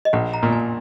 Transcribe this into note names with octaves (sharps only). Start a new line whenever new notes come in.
D#5
A#1 F#5
A#5
A#2
G#5